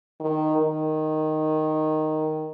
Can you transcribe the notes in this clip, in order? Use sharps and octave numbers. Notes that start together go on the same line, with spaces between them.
D#3
D#3